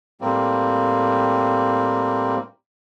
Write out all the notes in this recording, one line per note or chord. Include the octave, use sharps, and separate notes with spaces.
A2 G3 A#3 C4